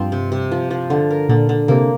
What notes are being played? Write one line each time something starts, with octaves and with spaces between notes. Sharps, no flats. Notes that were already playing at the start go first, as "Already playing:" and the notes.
Already playing: G2 F3 C4
C3
C3
F3
F3
D3
A#4
A#2 D3
D3
C3 A#3